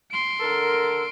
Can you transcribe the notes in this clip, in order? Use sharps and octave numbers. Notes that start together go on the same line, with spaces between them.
C6 D7
D3 A4 A#4